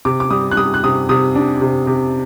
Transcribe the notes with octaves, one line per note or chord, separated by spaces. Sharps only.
C3 D6
D6
G3 D#6
F#6
G3 D#6
F#6
C3 D#6
C3 D#6
D4
C3
C3